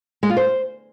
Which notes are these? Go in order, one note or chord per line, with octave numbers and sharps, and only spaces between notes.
G#3
F4
C5